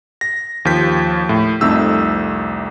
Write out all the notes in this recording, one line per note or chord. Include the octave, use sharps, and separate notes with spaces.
A#6
D#2 F3 G4 G6 B6
A2
C2 F2 A3 D#4 E6 G6